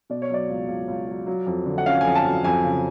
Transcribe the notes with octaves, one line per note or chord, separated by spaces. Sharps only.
B2 D5
C#5
F#3 D5
C#2
C#2
C#2
F#3
F#3
F2
D3
F#5
C#4 F5
G#5
F2
A5
F#3
F2 G#5
C#3